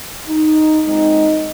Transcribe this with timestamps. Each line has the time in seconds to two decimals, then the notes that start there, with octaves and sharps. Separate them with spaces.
0.28 D#4
0.84 A#2 G#3 C4 D#4